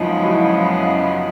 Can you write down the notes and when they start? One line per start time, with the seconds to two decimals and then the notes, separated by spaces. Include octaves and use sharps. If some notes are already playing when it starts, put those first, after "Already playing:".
Already playing: F#2 C#3 F3 G#3 B3 D#4 F4
0.23 E4 F#4